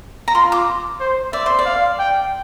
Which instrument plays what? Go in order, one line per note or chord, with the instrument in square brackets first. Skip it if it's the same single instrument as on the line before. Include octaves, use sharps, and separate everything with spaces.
[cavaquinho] A#5
[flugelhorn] F4 [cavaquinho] C6
[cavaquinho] D6
[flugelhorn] C5
[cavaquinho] D5 [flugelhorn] E5
[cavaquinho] C5
D5
[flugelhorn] F5
G5